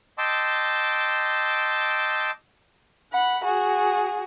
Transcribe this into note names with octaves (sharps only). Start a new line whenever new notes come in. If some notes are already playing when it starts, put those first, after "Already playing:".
D#5 G5 A5 C6 D6 E6
F#5 B5
F#4 G#4